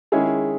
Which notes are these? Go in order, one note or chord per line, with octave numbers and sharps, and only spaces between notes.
D#3 G#3 C#4 E4 G#4